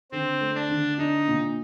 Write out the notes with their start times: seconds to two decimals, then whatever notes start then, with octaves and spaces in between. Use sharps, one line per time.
0.11 D3 C4
0.41 A3
0.55 D4
0.69 D3
0.98 D4 D#4
1.28 A#2